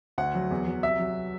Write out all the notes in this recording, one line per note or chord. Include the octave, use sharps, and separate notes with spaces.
D2 F#5
F#3
E2
F#3
C2 E5
F#3